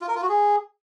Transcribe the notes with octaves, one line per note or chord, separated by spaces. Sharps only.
F4
A#4
F4
F#4
G#4